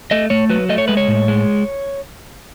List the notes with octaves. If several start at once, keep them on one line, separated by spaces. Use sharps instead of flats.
A3 D#5
A3 C#5
F#3 B4
A3 D#5
C#5
G#3 B4
C#5
A2
G#3